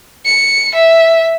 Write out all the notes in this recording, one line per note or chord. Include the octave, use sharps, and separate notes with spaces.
C#7
E5